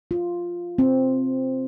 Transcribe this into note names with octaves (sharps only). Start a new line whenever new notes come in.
F4
C4